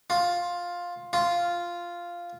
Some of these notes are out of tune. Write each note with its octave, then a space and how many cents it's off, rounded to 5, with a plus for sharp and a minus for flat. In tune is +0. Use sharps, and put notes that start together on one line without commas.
F4 +10
F4 -5